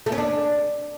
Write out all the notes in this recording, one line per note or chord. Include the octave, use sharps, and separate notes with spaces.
A3
C#4
D4